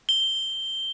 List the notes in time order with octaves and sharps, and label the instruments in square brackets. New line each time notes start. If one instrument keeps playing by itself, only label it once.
[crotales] G7